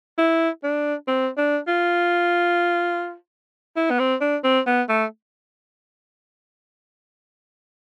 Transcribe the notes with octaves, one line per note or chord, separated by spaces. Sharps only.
E4
D4
C4
D4
F4
E4
B3
C4
D4
C4
B3
A3